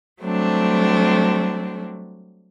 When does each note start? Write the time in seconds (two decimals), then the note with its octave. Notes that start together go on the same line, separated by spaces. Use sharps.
0.21 F#3 G3 A3 C4 D4